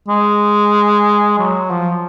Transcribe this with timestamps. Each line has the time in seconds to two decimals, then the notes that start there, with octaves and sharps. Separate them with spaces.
0.08 G#3
1.38 F#3
1.71 F3